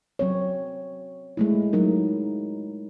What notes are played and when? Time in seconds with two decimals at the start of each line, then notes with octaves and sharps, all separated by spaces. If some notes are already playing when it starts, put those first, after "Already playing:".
0.19 F#3 C4 C#5
1.37 G#3 A3 E4
1.73 F#3 A3 D#4 A#4